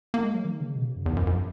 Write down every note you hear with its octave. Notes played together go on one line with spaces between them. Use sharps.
A#3
G#3
F#3
D#3
C#3
B2
C#3
F#2
E2
F#2
F#2